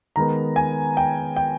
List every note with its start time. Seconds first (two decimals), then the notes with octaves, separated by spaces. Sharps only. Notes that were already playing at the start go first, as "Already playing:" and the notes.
0.16 D#3 G#3 B3 A#5
0.56 G#5
0.97 G5
1.36 G5